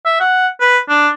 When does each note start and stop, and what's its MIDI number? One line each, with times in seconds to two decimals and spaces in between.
0.05 0.20 76
0.20 0.48 78
0.61 0.79 71
0.89 1.09 62